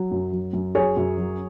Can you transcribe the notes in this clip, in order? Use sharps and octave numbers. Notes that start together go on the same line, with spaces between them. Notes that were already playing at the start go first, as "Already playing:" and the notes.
Already playing: F#3
F#2
F#3
F#2
F#3 G#4 C#5
F#2
F#3